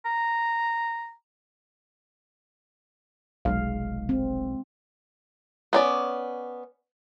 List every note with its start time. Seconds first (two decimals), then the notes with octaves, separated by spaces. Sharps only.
0.06 A#5
3.45 F1 B1 G#3 F5
4.09 C4
5.73 B3 C#4 D5